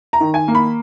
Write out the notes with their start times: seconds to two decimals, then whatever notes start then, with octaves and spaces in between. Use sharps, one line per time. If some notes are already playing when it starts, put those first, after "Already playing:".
0.13 A#5
0.20 D#3
0.34 G#5
0.48 A#3
0.55 B5